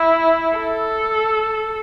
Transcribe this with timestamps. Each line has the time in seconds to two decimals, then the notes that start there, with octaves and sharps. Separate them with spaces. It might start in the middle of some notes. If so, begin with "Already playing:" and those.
Already playing: E4
0.56 A4